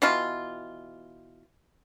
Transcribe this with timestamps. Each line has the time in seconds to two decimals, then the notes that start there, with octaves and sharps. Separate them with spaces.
0.02 B2 E3 F4